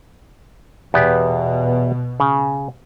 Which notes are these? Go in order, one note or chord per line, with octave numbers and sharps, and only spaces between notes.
E2 B2 B3 G4
C#3